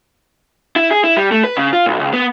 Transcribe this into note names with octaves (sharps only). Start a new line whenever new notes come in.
E4
G#4
E4
G3
A3
B4
C#3
F4
B1
C#2
B3